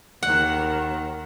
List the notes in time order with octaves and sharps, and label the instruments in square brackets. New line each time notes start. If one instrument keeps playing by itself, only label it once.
[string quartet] D#2 D#3 [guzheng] F#5